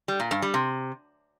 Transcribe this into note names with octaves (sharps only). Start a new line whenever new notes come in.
G3
A#2
G2
G3
C3